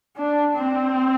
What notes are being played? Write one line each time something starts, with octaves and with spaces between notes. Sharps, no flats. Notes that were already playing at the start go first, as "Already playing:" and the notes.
D4
C4